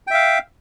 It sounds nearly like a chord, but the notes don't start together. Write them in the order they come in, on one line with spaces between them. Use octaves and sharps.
G5 E5 F5